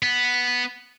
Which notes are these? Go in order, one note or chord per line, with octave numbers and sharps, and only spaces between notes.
B3